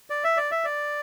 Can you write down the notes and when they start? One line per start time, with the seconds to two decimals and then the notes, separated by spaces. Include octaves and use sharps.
0.10 D5
0.24 E5
0.37 D5
0.51 E5
0.64 D5